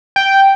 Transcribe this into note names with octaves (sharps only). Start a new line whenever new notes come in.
G5